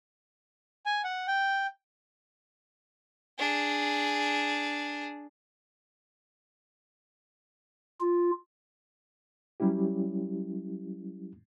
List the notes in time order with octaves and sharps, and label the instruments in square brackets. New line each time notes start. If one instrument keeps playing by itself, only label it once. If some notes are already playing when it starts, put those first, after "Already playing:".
[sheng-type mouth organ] G#5
F#5
G5
[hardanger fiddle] D4 G#4
[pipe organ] F4
[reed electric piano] F#3 G3 C#4 E4 G4